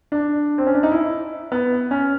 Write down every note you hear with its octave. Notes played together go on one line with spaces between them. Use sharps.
D4
C4
C#4
D4
D#4
E4
B3
C#4